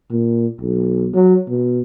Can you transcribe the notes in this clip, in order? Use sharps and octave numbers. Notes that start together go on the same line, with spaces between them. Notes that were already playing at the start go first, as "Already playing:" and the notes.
A#2
B1
F#3
B2